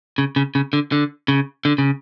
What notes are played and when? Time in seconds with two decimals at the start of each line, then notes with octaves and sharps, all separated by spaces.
0.18 C#3
0.36 C#3
0.55 C#3
0.73 D3
0.92 D3
1.28 C#3
1.65 D3
1.78 C#3